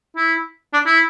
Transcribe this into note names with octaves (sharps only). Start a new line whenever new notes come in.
E4
D4
E4